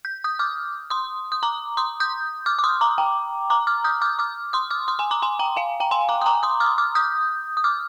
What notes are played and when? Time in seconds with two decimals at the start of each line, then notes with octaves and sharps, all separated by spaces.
0.05 G6
0.24 D#6 G6
0.39 D6 F6
0.90 C6 D#6
1.32 D#6
1.43 A#5 D6
1.77 C6 D#6
2.00 D#6 G6
2.46 D6 F6
2.59 D6
2.64 C6 D#6
2.81 A#5 D6
2.98 G5 A#5
3.50 A#5 D6
3.67 D6 F6
3.84 D#6 G6
4.02 D6 F6
4.19 D6 F6
4.53 C6 D#6
4.71 D6 F6
4.88 C6 D#6
4.99 G#5 C6
5.11 A#5 D6
5.22 G#5 C6
5.39 G5 A#5
5.56 F5 G#5
5.80 G5 A#5
5.91 G#5 C6
6.09 A#5 D6
6.21 D#6
6.26 A#5 D6
6.43 C6 D#6
6.60 D6 F6
6.78 D6 F6
6.95 D#6 G6
7.57 D#6
7.64 D6 F6